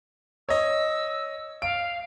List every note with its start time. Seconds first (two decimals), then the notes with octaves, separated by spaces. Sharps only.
0.49 C#5 D#5 E6
1.62 F5 D7